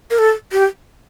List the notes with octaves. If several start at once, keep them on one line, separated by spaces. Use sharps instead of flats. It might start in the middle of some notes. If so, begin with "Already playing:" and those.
A#4
A4
G4